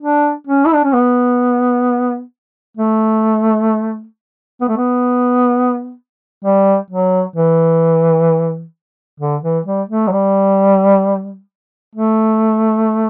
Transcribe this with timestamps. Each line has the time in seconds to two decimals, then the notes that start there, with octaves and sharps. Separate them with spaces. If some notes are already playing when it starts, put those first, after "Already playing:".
0.01 D4
0.47 C#4
0.66 E4
0.75 D4
0.84 C#4
0.93 B3
2.77 A3
4.61 B3
4.69 A3
4.77 B3
6.45 G3
6.91 F#3
7.36 E3
9.20 D3
9.43 E3
9.66 G3
9.89 A3
10.08 F#3
10.12 G3
11.96 A3